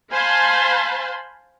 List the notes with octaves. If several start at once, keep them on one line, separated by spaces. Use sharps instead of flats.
C5 F5 G#5 A5 B5 C6